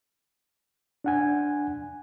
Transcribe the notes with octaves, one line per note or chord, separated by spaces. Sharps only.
D4 F#5 G#5